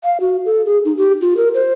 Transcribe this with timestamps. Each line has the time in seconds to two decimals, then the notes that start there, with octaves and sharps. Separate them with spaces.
0.04 F5
0.20 F#4
0.45 A4
0.66 G#4
0.85 D#4
0.97 G4
1.21 F4
1.37 A#4
1.54 C5